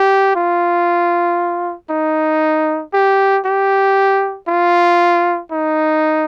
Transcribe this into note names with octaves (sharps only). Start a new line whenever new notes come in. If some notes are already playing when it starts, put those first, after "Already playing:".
Already playing: G4
F4
D#4
G4
G4
F4
D#4